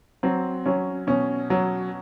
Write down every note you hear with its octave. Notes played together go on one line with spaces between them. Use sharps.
F#3 C4
F#3 C#4
B2 C#4
F#3